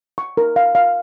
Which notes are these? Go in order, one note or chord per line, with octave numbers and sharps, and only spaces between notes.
C#6
A#4
F5
F5